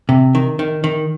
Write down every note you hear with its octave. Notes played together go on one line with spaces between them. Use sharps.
C3
D#3
D#3
D#3